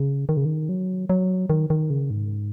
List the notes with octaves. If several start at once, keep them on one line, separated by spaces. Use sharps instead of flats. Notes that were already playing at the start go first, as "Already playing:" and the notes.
Already playing: C#3
D#3
C#3
D#3
F#3
F#3
D#3
D#3
C#3
G#2